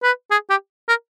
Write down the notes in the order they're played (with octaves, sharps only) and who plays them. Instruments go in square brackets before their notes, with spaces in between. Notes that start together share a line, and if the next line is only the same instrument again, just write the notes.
[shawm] B4
G#4
G4
A#4